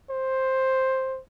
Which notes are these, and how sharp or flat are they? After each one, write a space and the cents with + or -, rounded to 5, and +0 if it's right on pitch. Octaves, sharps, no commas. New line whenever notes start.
C5 +10